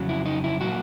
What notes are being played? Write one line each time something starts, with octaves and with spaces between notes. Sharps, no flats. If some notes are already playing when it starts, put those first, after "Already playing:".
Already playing: F2 C#3 F#3
E4
D#4
E4
A#2 F#3 A#3 F#4